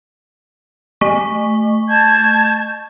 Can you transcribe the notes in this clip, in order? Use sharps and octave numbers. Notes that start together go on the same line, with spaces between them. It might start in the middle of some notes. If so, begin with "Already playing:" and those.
A3 C#6
A5 G6 G#6